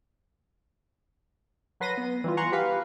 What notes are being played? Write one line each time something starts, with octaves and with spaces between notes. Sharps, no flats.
F#3 B4 C6 A#6 D#7
B3
E3 G3 F4
F#5 G#5 A#5 C6 C#6
G4 B4 F5